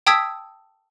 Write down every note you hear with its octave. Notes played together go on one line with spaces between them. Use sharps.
G5 A5 D#6 E6 G#6 B6